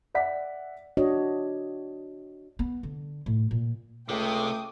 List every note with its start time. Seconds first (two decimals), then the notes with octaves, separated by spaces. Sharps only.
0.15 D5 E5 F#5 B6
0.97 D4 F#4 C#5 D#5
2.59 B3
2.83 D3
3.26 A2
3.51 A#2
4.09 C#2 C3 A3 G5 D6 D#6